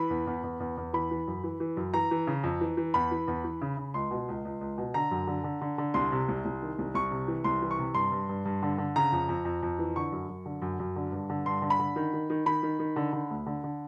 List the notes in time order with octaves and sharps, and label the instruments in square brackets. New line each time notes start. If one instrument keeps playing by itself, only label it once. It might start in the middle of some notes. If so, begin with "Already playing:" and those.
Already playing: [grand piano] E3 B5
E2
E2
E2
E2
E2
E3 B5
E3
F#2
E3
E3
F#2
E3 A#5
E3
C#3
F2
E3
E3
E2 B5
E3
E2
E3
C#3
C#3
C#2 C6
B2
C#2
C#2
C#2
B2
D3 A#5
F#2
D3
D3
D3
D3
C2 C6
C3
C2
C2
D#3
C2
C2 C#6
C3
E3
C2 C6
E3
C#6
C3
G2 C6
G2
G2
G2
D3
D3
C#3 A#5
F2
F2
F2
F2
E3
D3 C#6
F#2
F#2
D3
F#2
F#2
D3
G2
D3
G2 C6
D3
B5
D3
D#3
D#3
D#3
D#3 B5
D#3
D#3
D3
D3
D2
D3
D3